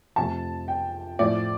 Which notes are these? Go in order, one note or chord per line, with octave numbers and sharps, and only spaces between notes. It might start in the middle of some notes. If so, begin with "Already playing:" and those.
F2 C3 F3 A3 A5
G5
A2 F3 A3 D5